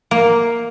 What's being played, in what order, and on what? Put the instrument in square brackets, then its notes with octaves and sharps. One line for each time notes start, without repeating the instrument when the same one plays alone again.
[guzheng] A#3